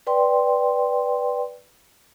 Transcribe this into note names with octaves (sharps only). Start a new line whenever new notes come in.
B4 D5 G5 C6